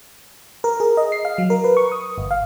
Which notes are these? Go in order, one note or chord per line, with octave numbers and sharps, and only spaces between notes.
A#4
G#4
D#5
C7
F5
F#3
A#4
B4
C#6
D#6
G1
F5